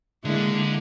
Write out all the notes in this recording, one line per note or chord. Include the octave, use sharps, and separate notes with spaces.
D3 G#3 A#3 E4